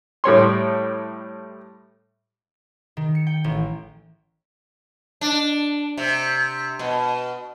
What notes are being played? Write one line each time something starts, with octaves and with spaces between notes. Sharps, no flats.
A2 G3 C#5 C6
D#3
C#7
G5
A1
D4
C3
B2